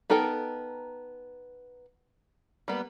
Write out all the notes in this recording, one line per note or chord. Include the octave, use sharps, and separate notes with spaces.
B3 D#4 A4 A#4 G5
G3 A#3 B3